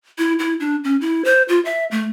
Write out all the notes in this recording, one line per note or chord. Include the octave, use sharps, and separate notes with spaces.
E4
E4
D4
C#4
E4
C5
F4
E5
A3